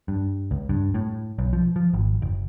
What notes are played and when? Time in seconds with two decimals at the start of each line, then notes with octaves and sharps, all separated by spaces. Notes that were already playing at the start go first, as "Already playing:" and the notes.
0.08 G2
0.51 C#2
0.69 G2
0.94 A2
1.38 B1
1.53 F3
1.76 F3
1.94 G#1
2.22 F#1